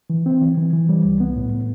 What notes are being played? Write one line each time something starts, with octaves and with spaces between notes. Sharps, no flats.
E3
C4
E3
E3
E3
G3
C2
B3
A2
A2